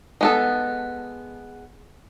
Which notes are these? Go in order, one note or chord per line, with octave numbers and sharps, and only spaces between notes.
G#3 B3 A4